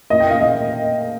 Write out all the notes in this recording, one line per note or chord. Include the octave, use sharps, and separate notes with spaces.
A#2 D#5
G5
A#2 F5
D#5